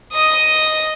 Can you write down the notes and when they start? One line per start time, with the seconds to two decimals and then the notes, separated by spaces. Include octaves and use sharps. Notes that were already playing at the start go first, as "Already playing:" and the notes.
0.13 D#5 D#6